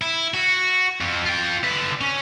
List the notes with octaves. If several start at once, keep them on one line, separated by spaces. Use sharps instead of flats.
E4
F#4
F2
F4 G5
D3 B4
C#4